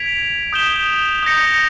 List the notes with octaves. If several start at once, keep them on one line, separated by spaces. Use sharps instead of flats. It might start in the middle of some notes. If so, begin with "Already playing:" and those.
Already playing: G#6 B6 D7 F7
D#6 G6 B6 E7 G7
D#6 G6 A#6 C#7